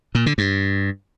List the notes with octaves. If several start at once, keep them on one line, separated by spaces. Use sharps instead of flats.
A#2
D3
G2